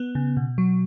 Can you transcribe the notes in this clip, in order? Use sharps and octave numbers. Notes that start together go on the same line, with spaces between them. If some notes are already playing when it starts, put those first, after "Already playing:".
Already playing: B3
C#3
B2
F#3